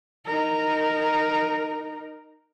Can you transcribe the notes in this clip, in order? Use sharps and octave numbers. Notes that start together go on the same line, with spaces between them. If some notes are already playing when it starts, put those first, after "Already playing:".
D#4 A#4